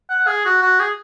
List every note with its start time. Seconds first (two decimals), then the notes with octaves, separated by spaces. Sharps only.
0.10 F#5
0.27 G#4
0.45 F#4
0.62 F#4
0.80 G#4